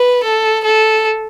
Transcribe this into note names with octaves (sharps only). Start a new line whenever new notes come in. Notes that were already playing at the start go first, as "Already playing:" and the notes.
Already playing: B4
A4
A4